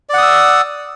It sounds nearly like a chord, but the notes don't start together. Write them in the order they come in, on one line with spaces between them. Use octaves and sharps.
D5 F#5 D#6 E6